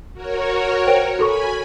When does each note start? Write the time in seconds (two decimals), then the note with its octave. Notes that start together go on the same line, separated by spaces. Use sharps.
0.13 F#4 A#4 C#5
0.87 C5 G5 D7
1.19 F#4 A4 G#5 B5 C#6